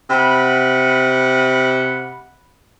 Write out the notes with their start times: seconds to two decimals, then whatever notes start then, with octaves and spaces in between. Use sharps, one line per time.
0.10 C3 F#5 B5